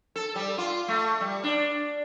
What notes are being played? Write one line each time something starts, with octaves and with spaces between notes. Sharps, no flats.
A4
G3
F4
A3
G3
D4